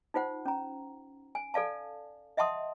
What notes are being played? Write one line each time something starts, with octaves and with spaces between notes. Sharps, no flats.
D#4 F4 C5 F#5
C#4 A#5
G#5
A4 D5 F5 A5
D#5 E5 F#5 A5 C6 D#6